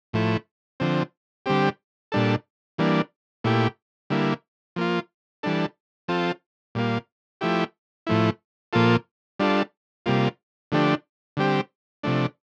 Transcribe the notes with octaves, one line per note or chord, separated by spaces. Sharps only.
A2 F3 A3 E4
D3 F3 C4
D3 G3 C4 G4
A#2 G3 D4 A4
E3 G3 A#3 D4
A#2 A3 E4 G4
D3 G3 A#3 E4
F3 A#3 F4
E3 G3 D4 A4
F3 C4 F4 A4
A#2 G3 A#3 F4
F3 A3 E4 G4
A2 F3 A3 E4
A#2 F3 A#3 F4 A4
G3 D4 F4 A4
C3 G3 A#3 F4
D3 F3 A3 D4 G4
D3 G3 C4 G4
C3 F3 A3 D4